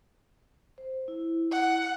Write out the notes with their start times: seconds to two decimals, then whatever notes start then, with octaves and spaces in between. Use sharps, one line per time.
0.78 C5
1.08 E4
1.52 F#5